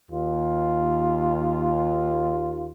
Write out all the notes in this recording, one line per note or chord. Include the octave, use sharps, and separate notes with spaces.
D#2 F4